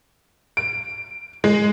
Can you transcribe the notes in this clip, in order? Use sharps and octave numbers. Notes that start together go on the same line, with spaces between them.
D7
G#3